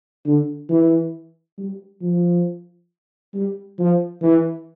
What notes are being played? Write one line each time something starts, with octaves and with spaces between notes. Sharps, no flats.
D3
E3
G3
F3
G3
F3
E3